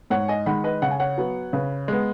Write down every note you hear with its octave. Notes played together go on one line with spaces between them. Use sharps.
G#2 C#5 F#5
D#5 G#5
D#3 G#3 F#5 B5
B4 D#5
C#3 F#5
G#5
C#5 F#5
F#3 B3
C#3 B4
G#3 B3